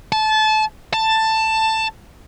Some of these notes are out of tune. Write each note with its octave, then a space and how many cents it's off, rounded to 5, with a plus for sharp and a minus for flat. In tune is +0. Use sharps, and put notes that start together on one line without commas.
A5 -25
A5 +10